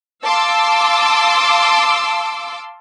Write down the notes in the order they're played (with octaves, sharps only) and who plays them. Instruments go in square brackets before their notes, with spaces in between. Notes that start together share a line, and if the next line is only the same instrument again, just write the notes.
[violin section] F5 A5 C6 D6 E6